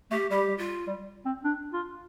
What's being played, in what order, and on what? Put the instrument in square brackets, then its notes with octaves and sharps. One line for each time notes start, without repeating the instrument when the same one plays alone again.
[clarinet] A3 [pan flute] G4
[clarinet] G3 [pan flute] G4
[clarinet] G3
[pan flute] F4
[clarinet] G3
C4
D4
F4